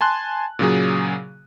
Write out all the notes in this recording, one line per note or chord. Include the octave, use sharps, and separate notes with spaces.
G#5 A5 C6 F#6
A#2 C#3 F#3 G#4